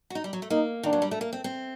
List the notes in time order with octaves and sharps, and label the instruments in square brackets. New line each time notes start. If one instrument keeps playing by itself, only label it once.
[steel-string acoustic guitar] F#4
D#4
G3
F#3
A3
[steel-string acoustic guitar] A#3 [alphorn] D#4
[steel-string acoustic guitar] D#3 [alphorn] D4
[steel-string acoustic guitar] F#3
G3
A3
A#3
C4
C4